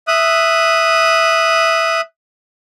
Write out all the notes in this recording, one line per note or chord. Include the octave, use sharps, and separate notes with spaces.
E5 D#6 F#6